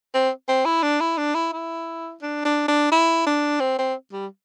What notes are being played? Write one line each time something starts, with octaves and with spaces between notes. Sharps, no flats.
C4
C4
E4
D4
E4
D4
E4
E4
D4
D4
D4
E4
D4
C4
C4
G3